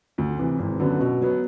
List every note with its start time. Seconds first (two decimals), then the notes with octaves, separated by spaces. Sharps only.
0.18 D2
0.38 C3 E3
0.59 G#1
0.80 F#2 D3 F#3 B3
1.00 B2
1.21 F#3 B3